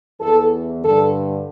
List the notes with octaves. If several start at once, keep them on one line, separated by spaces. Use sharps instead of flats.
E2 E3 A4
G2 D3 A4